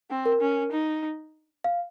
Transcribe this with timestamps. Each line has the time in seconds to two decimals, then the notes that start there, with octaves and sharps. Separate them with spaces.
0.10 C4
0.26 A#4
0.41 C#4
0.72 D#4
1.64 F5